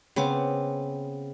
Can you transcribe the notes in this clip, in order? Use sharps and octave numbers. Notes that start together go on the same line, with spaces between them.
C#3 B3 C4 D6